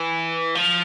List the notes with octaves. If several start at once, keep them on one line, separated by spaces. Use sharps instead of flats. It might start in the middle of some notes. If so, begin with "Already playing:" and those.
Already playing: E3
F3